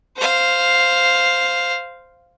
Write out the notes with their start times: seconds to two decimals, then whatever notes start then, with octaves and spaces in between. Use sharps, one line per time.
0.17 C5 F5